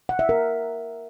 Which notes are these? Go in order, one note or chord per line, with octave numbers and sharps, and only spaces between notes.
F#5
E5
A#4